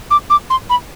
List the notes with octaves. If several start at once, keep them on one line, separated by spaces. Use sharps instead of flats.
D6
D6
C6
B5